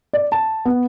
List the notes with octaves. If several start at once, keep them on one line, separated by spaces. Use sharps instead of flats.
D5
A5
B3